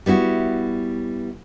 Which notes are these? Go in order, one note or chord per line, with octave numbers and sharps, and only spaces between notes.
G3 B3 E4 F#4